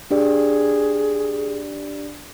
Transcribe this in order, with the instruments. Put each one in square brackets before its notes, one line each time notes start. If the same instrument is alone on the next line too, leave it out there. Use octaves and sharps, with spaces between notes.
[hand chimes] D4 G4 D5 [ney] G#4